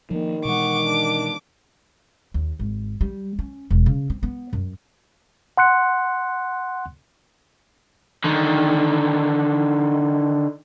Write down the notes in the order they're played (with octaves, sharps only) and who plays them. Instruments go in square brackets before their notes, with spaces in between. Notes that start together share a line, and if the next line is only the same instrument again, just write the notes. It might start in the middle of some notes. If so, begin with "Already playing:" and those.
[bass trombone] D#3 [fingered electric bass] F3 G3 A#3
[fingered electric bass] B2 E3 G#3 [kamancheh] F#5 C#6 [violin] D6
[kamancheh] D4
[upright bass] D#2
G#1
G3
C#4
E1
C#3
C4
B3
F#2
[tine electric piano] F#5 C6 F#6 C#7
[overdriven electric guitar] D3 D#3